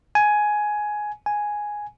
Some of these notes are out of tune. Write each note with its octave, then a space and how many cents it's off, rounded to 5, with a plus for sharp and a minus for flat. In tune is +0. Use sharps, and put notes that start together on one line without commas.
G#5 +10
G#5 +0